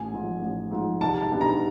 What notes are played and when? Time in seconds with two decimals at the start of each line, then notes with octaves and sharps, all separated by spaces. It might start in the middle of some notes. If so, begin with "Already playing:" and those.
Already playing: A1 G#5
0.11 G#2 F3
0.41 A1
0.71 G#2 F3
1.01 C2 A5
1.21 A5
1.31 B2 G3 B3 D4
1.41 A#5